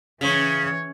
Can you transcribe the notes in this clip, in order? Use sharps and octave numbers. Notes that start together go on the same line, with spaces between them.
C#3 E3 C#5